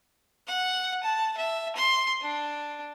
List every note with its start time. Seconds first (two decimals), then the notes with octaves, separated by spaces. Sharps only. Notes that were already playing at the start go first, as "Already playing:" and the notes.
0.47 F#5
1.04 A5
1.37 E5
1.76 C6
2.22 D4